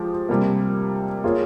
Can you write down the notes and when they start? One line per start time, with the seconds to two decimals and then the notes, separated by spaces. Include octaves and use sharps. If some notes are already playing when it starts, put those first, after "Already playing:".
Already playing: F3 G#3 G4 C5
0.29 C3 G3 A#3
1.24 A#3 F4 G#4 C#5